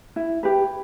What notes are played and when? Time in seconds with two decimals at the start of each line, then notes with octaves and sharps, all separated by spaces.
0.16 E4
0.43 G4 B4